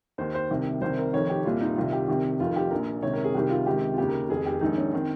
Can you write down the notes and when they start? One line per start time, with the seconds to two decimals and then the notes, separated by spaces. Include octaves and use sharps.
0.18 D#2 D#3 C5
0.34 C5
0.50 C2 C3 D#3
0.81 C2 C3 D#3 C5
0.98 A#4
1.13 F1 F2 D#3 C#5
1.30 G4
1.45 C2 A#2 F4
1.61 D#4
1.76 C2 C3 D#3 F4
1.93 G4
2.08 C2 C3 D#3
2.39 F1 F2 D#3 F4
2.56 G4
2.71 A#1 A#2 A#4
3.03 C#2 C3 D#3 C#5
3.13 A#4
3.24 G#4
3.34 C2 C3 D#3 G4
3.50 F4
3.66 C#2 C3 D#3 G4
3.94 F4
3.98 D#2 C#3 G4
4.09 A#4
4.29 F1 F2 D#3 G#4
4.46 G4
4.61 A#1 G#2 D#3 D#4
4.77 C#4
4.92 D#3 C4